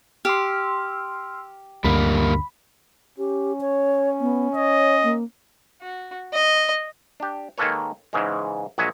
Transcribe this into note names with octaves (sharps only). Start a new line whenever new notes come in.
G4 C6 E6 F6
D2 G2 D3 G3 A#3 B5
C#4 G4
C#5
B3
C#5 D#5
A#3
F#4
D#5
D4 G4
D#3 G#3 A#3 A4 B4 C#5
G#2 C#3 E3 G#3
A#1 F#3 G#3 C#5 E5 G#5